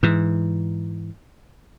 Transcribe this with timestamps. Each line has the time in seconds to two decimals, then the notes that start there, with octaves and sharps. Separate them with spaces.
0.03 G#2 E3